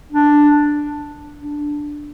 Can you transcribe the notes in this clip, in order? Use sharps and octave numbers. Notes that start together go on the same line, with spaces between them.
D4
D4